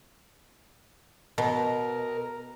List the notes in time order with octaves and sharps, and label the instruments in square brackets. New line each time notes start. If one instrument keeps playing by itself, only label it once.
[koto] B2 [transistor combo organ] A#4